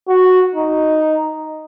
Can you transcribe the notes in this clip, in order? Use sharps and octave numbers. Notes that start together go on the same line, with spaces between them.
F#4
D#4